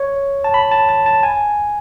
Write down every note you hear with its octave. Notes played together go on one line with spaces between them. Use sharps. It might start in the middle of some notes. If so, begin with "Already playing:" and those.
Already playing: C#5
A5
B5
A5
A5
A5
G#5